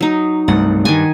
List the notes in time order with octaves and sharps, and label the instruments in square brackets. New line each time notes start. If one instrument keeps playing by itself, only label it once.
[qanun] F#3 D#4
[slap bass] C2 G2 A3 [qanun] F#5
[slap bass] G2 [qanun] D#3 G#5